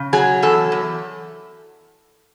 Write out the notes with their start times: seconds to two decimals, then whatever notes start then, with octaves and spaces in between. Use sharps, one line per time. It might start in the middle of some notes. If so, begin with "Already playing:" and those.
Already playing: C#3
0.13 F#3 G#4
0.42 E2 A4
0.72 E2